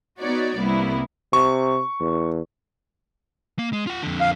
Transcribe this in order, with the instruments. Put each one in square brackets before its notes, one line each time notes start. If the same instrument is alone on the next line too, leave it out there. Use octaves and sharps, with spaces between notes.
[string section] B3 D#4 F#4 C#5 D5
C2 A#3 B3 E4
[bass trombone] C3 [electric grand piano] C#6
[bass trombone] E2
[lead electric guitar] A#3
G#3
F4 F#5
F2 D3
[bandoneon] F5